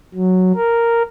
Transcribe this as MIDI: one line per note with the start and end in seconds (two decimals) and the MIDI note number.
0.15 0.52 54
0.56 1.03 70